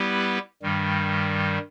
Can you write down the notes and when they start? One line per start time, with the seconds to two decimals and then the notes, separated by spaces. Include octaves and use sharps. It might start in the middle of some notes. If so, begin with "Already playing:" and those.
Already playing: G3 B3 E4 G4 B4
0.62 G2 D#3 G3